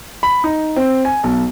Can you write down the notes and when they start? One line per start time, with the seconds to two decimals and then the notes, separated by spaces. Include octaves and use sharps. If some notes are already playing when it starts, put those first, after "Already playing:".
0.23 B5
0.44 D#4
0.76 C4
1.05 G#5
1.24 B1